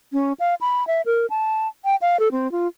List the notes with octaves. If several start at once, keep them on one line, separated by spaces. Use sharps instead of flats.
C#4
F5
B5
E5
A#4
A5
G5
F5
A4
C4
F4